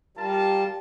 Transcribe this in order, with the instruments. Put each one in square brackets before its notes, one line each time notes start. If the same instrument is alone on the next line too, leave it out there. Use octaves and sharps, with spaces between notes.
[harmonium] G3 [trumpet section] F4 A#4 A5